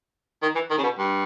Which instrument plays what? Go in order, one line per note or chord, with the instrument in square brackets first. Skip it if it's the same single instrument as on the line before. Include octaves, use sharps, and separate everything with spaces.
[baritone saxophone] D#3
E3
D#3
C#3
B2
G2